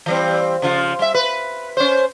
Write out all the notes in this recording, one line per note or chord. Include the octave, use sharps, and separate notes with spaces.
E3 G3 C4
C#3 F3 F4
G3 E5
B4
C#4 C5